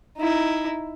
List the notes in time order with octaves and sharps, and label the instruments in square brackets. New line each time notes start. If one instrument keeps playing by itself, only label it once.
[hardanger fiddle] D#4 E4